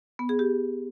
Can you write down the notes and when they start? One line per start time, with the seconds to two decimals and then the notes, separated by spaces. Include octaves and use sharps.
0.19 B3
0.29 G#4
0.39 G4